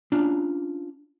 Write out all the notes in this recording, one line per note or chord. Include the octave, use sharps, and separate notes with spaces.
C#4 D4 F4